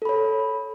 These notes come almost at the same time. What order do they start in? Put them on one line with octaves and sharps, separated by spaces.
A4 B5 C#5